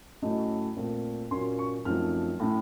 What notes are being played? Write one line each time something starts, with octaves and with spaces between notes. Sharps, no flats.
A2 F#3 A3 C#4 D#5
A#2 A3 C4
A#2 F#3 A#3 C#4 C6
C#6
F#2 F3 A3 C4 D#4 F6
A2 A3 C#4